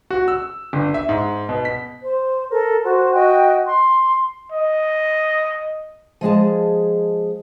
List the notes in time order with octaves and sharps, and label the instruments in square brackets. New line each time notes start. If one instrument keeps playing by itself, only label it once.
[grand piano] F#4
E6
G1
E5
G#2
B2
B6
[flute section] C5
A4 A#4
F#4 C5
F#4 D#5 G5
C6
[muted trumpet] D#5
[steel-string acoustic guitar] F3 G#3 G#4 A5